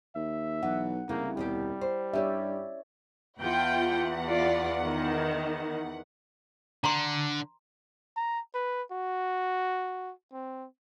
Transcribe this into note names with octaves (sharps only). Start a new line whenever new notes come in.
D#2 E5
B1 E3 F#5
C2 C#3 A3 A#3 D#4 E4
D#2 B2 G3 G4
C5
G2 C#4 G4 C#5 D5 E5
E2 F4 F#5 G5
F4 D5
D#3
D3 A#5 C6
A#5
B4
F#4
C4